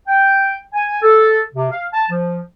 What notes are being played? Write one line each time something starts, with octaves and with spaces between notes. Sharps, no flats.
G5
G#5
A4
C3
F5
A5
F3